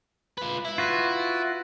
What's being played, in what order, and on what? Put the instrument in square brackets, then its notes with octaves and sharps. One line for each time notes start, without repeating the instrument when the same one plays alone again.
[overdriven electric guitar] F4 B4
E4
[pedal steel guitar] F4 F#4 B4